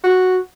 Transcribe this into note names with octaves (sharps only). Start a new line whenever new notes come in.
F#4